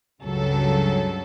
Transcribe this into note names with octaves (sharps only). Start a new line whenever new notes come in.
C#2 G2 C#3 F#3 A4